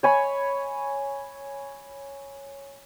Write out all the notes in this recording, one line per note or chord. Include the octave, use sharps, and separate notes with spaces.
C#5 G#5 B5